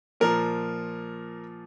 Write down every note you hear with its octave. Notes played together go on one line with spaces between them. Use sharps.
A#2 F3 A#4